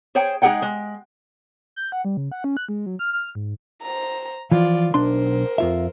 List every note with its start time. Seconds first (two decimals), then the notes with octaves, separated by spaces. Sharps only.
0.15 G#4 C5 C#5 G5
0.42 G#3 D#4 G#4 A4 F#5 G5
0.62 G#3
1.76 G6
1.92 F#5
2.05 G3
2.17 C#3
2.32 F#5
2.44 C#4
2.57 F#6
2.69 G#3
2.86 F#3
2.99 F6
3.13 F6
3.35 G#2
3.82 C5 A#5
4.52 E3 F3 F4 D5
4.94 B1 D4 A#4 C5 C6
5.58 F2 F4 E5